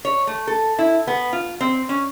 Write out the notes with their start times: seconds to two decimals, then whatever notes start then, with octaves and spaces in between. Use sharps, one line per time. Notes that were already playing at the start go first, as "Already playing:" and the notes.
0.05 C#5
0.27 A3
0.47 A4
0.79 E4
1.07 B3
1.33 F4
1.61 C4
1.89 C#4